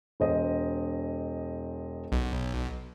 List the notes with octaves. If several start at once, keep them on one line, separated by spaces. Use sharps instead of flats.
E1 C5 D#5
B1